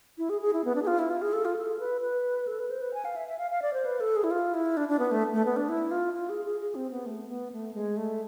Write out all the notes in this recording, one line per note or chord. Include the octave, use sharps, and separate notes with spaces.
E4
G#4
G#4
E4
B3
D4
G#4
F4
E4
F4
G#4
A4
F4
A4
B4
B4
A4
B4
C5
B4
G#5
F5
E5
E5
F5
F5
D5
C5
B4
A4
G#4
E4
F4
E4
D4
D4
B3
A3
A3
B3
D4
E4
F4
F4
G#4
G#4
G#4
C4
B3
A3
B3
A3
G#3
A3